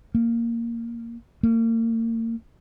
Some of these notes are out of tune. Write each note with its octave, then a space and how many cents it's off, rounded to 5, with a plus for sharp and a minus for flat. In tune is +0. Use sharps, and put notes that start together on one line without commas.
A#3 -5
A#3 -40